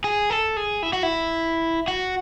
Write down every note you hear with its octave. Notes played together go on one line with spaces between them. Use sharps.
G#4
A4
G#4
E4
F#4
E4
F#4